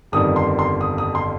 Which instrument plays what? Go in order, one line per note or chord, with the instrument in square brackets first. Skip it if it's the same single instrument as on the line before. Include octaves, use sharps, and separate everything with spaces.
[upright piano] G1 F2 D#3 G3 D#6
C6
C6
D#6
D#6
C6